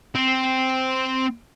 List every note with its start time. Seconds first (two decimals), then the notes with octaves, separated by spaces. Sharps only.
0.15 C4